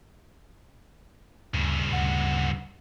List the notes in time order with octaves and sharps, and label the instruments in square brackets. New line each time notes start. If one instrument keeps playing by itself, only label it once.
[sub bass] D2 [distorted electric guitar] G2 C#3
[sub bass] D2 [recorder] F#5